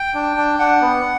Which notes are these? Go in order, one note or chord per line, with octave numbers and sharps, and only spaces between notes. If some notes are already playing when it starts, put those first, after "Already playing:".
Already playing: G5
D4
D4
D4 F#5
B3